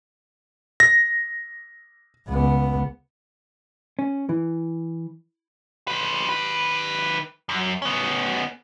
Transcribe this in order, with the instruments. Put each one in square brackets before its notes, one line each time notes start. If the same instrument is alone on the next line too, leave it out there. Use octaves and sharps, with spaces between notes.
[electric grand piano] A#6
[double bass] C#2 B3
[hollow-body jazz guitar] C#4
E3
[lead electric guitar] F3 B4
D#3 B4
F#2
B3 C#4